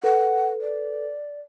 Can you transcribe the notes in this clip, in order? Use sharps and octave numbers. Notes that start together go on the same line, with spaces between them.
A4 B4 F#5
D5